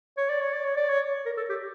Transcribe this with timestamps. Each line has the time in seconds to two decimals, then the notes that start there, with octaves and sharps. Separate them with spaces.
0.17 C#5
0.29 D5
0.41 C#5
0.53 D5
0.65 C#5
0.77 D5
0.89 C#5
1.26 A#4
1.37 A4
1.49 G4